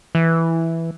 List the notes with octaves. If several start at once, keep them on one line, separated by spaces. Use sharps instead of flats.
E3